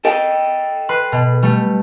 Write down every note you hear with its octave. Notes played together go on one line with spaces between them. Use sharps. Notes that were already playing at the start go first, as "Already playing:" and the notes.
A4 D#5 G5
B4 C6 F#6
B2
G3 A3